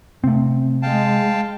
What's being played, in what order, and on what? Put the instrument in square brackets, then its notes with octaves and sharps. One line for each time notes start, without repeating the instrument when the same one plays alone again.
[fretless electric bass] C3 [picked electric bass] A3 C4
[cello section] G#3 [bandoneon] F5 G5 A5